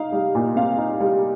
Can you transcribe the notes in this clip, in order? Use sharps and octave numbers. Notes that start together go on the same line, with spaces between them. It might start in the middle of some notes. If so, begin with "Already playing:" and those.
Already playing: D#4 F5
G3
A#2
C4 F5
D#4
G3